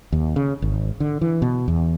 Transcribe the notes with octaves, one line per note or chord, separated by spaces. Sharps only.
D#2
C#3
G#1
D3
E3
B2
E2